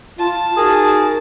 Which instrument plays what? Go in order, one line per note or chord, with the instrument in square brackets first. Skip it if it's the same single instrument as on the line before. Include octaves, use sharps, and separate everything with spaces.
[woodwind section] F4 [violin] A5
[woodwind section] D#4 F#4 A#4 [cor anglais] G#4